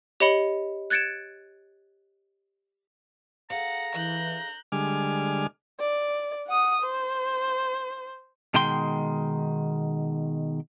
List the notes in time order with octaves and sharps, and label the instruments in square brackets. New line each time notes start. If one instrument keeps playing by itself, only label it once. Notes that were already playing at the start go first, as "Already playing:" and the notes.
[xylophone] G4 C#5 D#5 B5 C#7 G7
F#6 G#6 A6 C#7 D7 E7
[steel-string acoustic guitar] G#4 A4 F5 [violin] F#5 [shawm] A#5
[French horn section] E3 [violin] F#6 G6
[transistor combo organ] D3 G3 G#3 G#5 D6 F6
[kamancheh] D5
F#5 D#6
C5
[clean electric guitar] B2 D#3 G#3 G5 C6